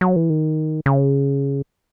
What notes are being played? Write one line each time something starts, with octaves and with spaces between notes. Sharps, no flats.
F#3
E3
D#3
C#3